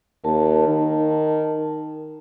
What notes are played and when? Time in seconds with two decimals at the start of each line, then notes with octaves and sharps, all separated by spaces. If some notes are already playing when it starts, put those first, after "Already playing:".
0.24 D#2 A#4 A5
0.68 D#3